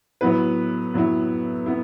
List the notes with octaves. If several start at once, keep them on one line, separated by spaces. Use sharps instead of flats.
A2 F#3 B3 E4 B4
A2 F#3 B3 E4
B3 E4